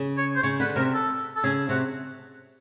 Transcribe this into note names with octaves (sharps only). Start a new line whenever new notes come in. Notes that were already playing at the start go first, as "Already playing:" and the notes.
Already playing: C#3
C#5
C5
C#3 C#5
D3 B4
C3 A#4
A4
A4
C#3 G#4
C3 F#4